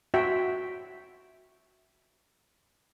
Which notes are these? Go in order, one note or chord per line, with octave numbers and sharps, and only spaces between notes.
F#4 E5 G5